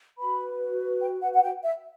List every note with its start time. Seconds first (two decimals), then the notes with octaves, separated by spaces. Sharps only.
0.18 F#4 B4 B5
1.00 G5
1.22 F#5
1.34 F#5
1.43 G5
1.63 E5